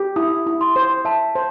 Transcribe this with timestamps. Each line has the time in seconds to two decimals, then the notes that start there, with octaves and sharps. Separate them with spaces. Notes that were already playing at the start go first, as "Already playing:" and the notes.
Already playing: G4
0.16 E4 D#6
0.47 E4
0.61 C6
0.76 C5
1.05 E5 A5
1.35 C5